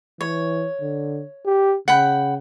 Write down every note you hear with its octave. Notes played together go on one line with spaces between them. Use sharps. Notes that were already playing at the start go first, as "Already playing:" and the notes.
E3 C#5
D3
G4
C#3 F#5 G5 B5